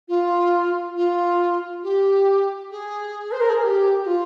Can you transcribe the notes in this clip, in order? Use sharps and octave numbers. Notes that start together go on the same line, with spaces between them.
F4
F4
G4
G#4
C5
A#4
G#4
G#4
G4
G4
F4